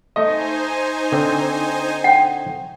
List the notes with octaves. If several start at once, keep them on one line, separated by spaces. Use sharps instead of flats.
A3 D#4 C5 D#5 G#5
D3 C4
F#5 G5